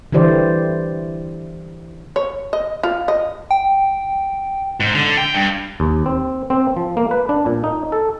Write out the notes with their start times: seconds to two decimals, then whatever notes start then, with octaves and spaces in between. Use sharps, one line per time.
0.12 D3 E3 E4 G4 C5 D5
2.16 C#5
2.53 D#5
2.83 F4
3.08 D#5
3.51 G5
4.80 G#2
4.95 D3
5.17 G5
5.35 G2
5.80 D#2
6.06 C4
6.50 C4
6.77 F3
6.97 A#3
7.11 B4
7.29 D4
7.46 A#2
7.64 D#4
7.92 A4